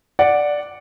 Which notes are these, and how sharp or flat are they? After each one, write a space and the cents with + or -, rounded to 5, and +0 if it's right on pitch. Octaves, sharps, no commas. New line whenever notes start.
D5 +0 F#5 -5